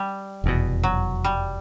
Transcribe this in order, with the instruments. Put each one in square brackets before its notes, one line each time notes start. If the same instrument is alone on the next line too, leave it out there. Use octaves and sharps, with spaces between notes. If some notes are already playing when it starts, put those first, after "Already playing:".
Already playing: [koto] G3
[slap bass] F1 E2 B2
[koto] F#3
G3